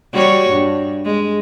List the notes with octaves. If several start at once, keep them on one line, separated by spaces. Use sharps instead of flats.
G3 F#4 C#5
G2
G#3